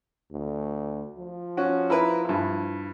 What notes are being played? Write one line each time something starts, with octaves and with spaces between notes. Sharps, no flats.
D2
F3
C#4 F#4
E4 A#4 B4
G2 E4